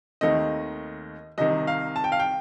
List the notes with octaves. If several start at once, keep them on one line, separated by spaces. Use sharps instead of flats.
D#2 D#3 A3 C4 D#5
C2 C3 D#3 D#5
F5
A5
G5
F5
G5